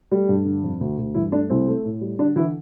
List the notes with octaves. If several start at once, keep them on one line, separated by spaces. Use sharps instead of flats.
G3 A3 G4
G2
D3
F2
D2
D2
G2 E3 E4
A3 D4
C2 C4
A3
A2
G3
D3 D4
D3 E3 E4